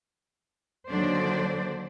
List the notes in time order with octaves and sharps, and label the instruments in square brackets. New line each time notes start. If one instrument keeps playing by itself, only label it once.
[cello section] D#2 D3 F#3 D4 C5 D5